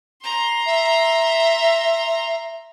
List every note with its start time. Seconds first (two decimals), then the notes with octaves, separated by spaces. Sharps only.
0.22 A#5 C6
0.66 E5